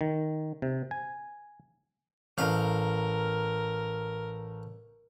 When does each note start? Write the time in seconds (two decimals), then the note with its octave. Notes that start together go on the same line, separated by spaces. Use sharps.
0.01 D#3
0.62 C3
0.91 G#5
2.38 A1 A#4 F5